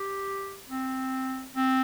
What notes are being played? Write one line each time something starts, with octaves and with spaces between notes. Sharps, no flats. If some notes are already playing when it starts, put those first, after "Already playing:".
Already playing: G4
C4
C4